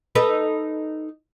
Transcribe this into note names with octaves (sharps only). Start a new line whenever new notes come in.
D#4 A4 B4